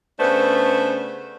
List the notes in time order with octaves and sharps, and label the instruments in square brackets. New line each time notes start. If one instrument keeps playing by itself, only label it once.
[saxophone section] C#3 A3 B3 D4 B4 C5